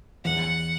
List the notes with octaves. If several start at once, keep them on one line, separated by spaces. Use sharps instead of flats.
E2 F#5